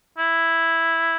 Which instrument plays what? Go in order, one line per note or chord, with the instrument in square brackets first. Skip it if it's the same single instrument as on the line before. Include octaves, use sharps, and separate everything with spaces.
[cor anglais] E4